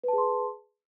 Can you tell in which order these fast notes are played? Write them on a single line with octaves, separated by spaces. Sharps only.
B4 A5 G#4 C6